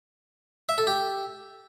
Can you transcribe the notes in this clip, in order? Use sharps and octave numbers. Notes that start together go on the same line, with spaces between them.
E5
A4
G4